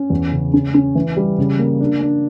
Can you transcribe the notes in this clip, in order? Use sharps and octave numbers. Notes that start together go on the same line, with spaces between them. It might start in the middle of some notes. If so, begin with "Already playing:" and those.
Already playing: C#4
E2
C#3
C#4
C#4
E3
G3
C#3
A#3
D4
D4